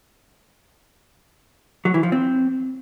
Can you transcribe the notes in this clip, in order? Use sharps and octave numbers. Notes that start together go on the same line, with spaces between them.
F#3
E3
F3
C4